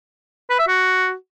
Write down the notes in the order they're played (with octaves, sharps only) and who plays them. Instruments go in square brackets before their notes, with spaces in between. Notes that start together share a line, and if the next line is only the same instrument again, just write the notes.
[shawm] B4
E5
F#4